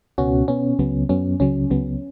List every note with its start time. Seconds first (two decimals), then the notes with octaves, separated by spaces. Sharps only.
0.18 C#2 B2 B3 C#4 F#4
0.48 B2 B3 C#4
0.79 C#2 C#3 F#3 B3
1.09 F#2 F#3 B3 C#4
1.40 C#2 C#3 F#3 C#4
1.70 C#2 C#3 F#3 B3